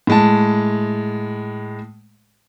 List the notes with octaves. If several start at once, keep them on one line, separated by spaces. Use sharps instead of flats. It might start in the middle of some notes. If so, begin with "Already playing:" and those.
A2 G#3 A5